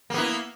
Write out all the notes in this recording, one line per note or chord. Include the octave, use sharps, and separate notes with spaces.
A#3 B3 E4